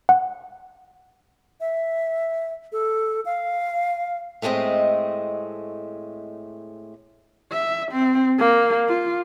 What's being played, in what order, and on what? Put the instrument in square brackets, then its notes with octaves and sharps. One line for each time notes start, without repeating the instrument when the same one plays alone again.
[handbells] F#5
[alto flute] E5
A4
F5
[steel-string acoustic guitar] A2 G#3 A3 C4 D#5
[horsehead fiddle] E5
C4
A#3
F4